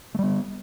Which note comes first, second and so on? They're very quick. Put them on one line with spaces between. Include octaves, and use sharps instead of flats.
A3 G3 B3